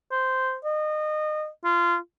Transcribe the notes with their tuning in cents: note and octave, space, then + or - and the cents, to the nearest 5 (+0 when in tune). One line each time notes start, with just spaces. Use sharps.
C5 -10
D#5 -30
F4 -20